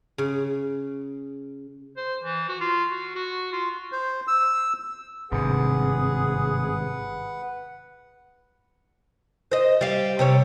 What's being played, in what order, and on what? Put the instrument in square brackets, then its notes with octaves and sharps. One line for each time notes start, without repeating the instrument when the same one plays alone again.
[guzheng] C#3
[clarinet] C5
E3
F#4
F4
F#4
F#4
F4
[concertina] C5
E6
[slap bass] G#1 G2 [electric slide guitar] C3 [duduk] G#4 [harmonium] B4 F#5
[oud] C5 D#5
G3 F5
C3 G3 C#5